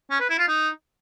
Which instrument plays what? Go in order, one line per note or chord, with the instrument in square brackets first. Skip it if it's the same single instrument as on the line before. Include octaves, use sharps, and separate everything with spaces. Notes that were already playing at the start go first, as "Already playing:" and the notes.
[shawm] C#4
B4
E4
F4
D#4